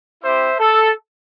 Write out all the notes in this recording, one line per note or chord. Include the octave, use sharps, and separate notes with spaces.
C4 E4 G4 C5 E5
A4